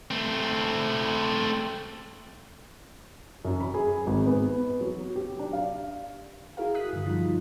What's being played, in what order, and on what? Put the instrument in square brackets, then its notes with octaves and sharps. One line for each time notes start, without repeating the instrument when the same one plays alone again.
[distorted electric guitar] A3 C4
[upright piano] F#2
B5
G#4
G#1
B3
F#3
G4
D4
F5
[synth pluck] E4 F#4 G#4 A#4 F5
D#6 F#6 B6
G2 D3
F3 G3 D#4 F4